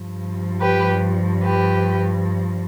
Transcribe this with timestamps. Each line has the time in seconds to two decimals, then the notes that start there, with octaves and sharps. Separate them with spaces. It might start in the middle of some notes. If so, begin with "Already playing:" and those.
Already playing: G2 F3
0.60 G4 B4
1.43 G4 B4